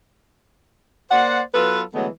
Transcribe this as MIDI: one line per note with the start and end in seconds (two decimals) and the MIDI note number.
1.11 1.40 58
1.11 1.40 72
1.11 1.40 74
1.11 1.40 78
1.55 1.82 54
1.55 1.82 59
1.55 1.82 65
1.55 1.82 69
1.55 1.82 71
1.94 2.07 50
1.94 2.07 52
1.94 2.07 54
1.94 2.07 56
1.94 2.07 57
1.94 2.07 59